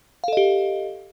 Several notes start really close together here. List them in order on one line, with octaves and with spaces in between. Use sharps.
F5 A4 D#5 G4